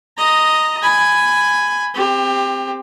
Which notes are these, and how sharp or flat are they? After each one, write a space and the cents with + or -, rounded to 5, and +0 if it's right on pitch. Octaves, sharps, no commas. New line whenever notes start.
D#5 +0 A#5 -10
G#5 +0 B5 +20
C4 +0 G4 +25